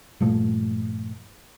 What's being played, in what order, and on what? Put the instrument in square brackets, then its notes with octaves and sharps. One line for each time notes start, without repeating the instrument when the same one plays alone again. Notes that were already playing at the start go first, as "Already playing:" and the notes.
[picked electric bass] G2 A#2 F3 A3